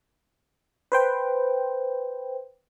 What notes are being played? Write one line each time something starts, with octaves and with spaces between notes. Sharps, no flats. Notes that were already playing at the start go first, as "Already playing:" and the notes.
B4 C5 G5